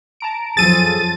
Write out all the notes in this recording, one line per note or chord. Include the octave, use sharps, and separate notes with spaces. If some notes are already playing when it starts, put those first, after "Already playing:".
A5 A#5 D7
F2 F3 F#3 G#4 A4 A5 A6 D#7